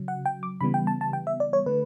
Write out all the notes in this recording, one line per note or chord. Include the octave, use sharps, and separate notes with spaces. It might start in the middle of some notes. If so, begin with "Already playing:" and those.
Already playing: C#3 F#3
F#5
G5
D6
C#3 E3 G3 B3 B5
G5
A5
A5
G5
E5
D5
C#5
D3 A3 B4